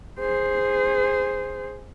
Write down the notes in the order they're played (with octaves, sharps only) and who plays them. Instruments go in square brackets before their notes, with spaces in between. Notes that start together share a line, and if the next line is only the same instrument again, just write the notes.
[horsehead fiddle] G#4 C5